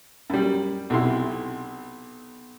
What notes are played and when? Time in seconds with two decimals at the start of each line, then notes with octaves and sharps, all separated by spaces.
0.30 F#2 G3
0.90 B1 C3 E4 C6